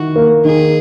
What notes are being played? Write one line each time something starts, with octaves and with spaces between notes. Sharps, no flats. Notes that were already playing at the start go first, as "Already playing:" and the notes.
Already playing: D#3 E4 F#4
A#3
D#3 G#4